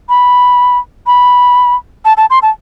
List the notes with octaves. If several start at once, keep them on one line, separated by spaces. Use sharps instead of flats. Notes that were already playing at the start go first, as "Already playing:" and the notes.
B5
B5
A5
A5
C6
A5